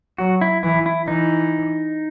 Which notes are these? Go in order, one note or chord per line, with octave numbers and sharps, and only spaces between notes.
F#3 F#4
E4
E3 E4
E4
E3 D#4